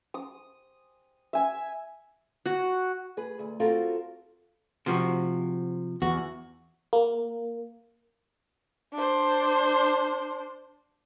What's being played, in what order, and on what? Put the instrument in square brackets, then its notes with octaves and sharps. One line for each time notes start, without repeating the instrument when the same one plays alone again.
[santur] D#6
E5 G#5
[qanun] F#4
[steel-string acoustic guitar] G#4 B4
D2
C4 F4 F#4 A4 A#4
[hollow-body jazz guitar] C3 F3 F#4
[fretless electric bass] E2 [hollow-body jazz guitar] F#4
[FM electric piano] A#3
[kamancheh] D4 C5